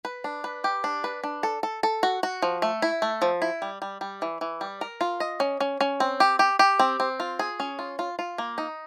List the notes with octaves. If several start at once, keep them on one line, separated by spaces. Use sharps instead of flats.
B4
D4
B4
G4
D4
B4
D4
A4
A4
A4
F#4
F#4
F3
A3
E4
A3
F3
E4
G3
G3
G3
E3
E3
G3
A#4
F4
D#5
C#4
C#4
C#4
C4
G4
G4
G4
C4
C4
F4
G#4
C#4
F4
F4
F4
A#3
D#4